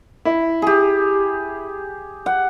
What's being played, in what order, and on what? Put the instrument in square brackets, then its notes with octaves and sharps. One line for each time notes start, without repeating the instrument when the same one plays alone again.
[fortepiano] E4
[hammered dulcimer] G4 G#4
F#5